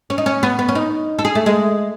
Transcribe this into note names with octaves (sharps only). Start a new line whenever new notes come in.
C#4
D#4
C#4
B3
B3
C#4
D#4
A4
G#4
A3
G#3